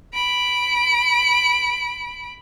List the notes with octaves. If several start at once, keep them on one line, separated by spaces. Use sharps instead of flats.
B5 D7